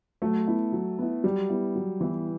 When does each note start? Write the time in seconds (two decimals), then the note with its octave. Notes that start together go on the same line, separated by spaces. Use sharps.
0.22 F#3 A3
0.47 B3 E4
0.72 F#3
0.99 B3 E4
1.23 F#3 G3
1.49 B3 E4
1.76 F#3
2.00 E3 B3
2.03 E4